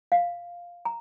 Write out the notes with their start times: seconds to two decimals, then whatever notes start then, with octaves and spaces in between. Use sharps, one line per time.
0.12 F5
0.85 A#5